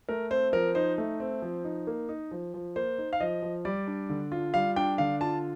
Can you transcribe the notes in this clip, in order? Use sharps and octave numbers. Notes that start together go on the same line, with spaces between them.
A3 A#4
C4 C5
F3 A#4
D#4 C5
A3
C4
F3
D#4
A#3
D#4
F3
F3
A#3 C5
D#4
F5
F3 D#5
F3
G3 D5
D4
D3
F4
G3 F5
D4 G5
D3 F5
F4 A5